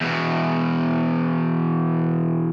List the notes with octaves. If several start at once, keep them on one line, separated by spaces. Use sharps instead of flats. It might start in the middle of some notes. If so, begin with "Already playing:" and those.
E2 B2